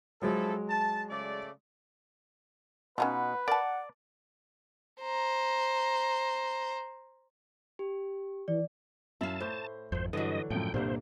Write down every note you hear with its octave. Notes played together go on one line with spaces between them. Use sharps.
F3 F#3 G#3 E4 A4
A5
C#3 A3 D5
B2 C#4 D#4 F4 B4 F#5
A#4 D5 F#5 A5
C5 A#5
G4
E3 D5
F#2 E4 F5 A5
A2 C5 G6
G#1 F2 C5
G2 D3 E3 F#3 D#5
F#2 A2 F3 G5
C2 G2 A#2 F3 A#3 C5